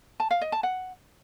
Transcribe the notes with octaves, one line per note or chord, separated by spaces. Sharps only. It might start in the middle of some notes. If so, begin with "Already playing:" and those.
A5
F5
D#5
A5
F#5